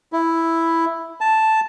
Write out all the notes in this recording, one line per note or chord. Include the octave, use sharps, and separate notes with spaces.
E4
A5